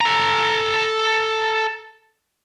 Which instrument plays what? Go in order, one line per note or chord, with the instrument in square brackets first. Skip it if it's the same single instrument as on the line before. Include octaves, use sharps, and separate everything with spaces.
[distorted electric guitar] A4 A#5